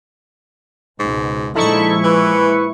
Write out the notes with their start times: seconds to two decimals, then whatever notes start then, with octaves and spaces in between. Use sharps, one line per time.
0.99 C#2 G#2 B2
1.55 A#2 D3 F3 G#3 D#4 E4 A4 C#6
2.03 E3 B4